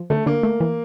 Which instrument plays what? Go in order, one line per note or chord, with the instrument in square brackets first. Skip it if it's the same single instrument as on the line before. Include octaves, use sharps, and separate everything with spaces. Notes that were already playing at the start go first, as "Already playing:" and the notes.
Already playing: [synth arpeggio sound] F3
[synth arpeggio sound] D3 [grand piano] A3
[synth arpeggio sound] D3 [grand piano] A#3
[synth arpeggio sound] A3
E3